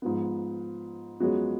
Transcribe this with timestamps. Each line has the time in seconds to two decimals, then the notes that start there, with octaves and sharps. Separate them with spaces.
0.02 G#2 F3 B3
1.20 F#2 F3 G#3 B3 F#4